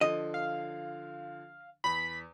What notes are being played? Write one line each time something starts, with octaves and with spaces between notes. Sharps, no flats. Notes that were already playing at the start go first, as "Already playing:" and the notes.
D3 F3 D#5
F5
E2 B5 B6